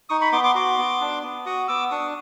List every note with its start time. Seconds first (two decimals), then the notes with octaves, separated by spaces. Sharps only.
0.09 D#4 C#6 D#6
0.21 B5 C#6
0.32 B3 C6 D6
0.43 C6 D6
0.55 F#4 C6 D6
0.78 B3
1.01 D4
1.23 B3
1.46 F#4 C#6 D#6
1.68 B3 D6 E6
1.90 D4 C#6 D#6